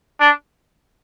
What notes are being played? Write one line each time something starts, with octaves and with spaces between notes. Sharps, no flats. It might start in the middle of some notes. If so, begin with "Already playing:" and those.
D4